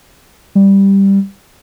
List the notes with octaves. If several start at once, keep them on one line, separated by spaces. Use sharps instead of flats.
G3